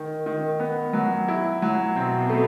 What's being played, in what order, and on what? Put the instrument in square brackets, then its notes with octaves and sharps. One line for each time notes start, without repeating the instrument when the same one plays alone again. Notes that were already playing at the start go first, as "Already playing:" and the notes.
Already playing: [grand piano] D#3
D#3
B3
F#3
E4
F#3
[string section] B2 [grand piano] C4
[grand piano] A3